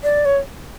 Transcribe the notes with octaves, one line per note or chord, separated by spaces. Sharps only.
D5
C#5